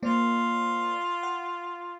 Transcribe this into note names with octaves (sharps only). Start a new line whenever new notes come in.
A#3 F4 C5 D5
F#5